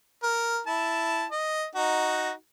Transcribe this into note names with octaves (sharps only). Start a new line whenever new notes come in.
A#4
E4 A5
D#5
D#4 F#4